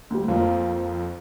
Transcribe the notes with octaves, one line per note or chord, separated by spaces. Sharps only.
D2 G3
F2 F3 A#3